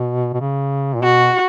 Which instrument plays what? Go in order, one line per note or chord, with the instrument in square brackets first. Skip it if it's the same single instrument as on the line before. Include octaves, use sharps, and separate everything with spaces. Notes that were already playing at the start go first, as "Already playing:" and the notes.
Already playing: [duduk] B2
B2
C#3
A#2
[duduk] B2 [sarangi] F#4